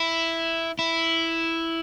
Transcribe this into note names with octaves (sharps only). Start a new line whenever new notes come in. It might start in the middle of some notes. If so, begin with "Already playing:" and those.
Already playing: E4
E4